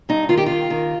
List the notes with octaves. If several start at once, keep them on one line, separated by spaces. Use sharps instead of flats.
G2 D#4
D#3 F4
G4
D#3 F4
D#3